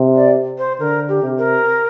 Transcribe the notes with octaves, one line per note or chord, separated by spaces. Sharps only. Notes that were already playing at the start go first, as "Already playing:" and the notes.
Already playing: C3
D5
C5
D3 A#4
G4
C3
A#4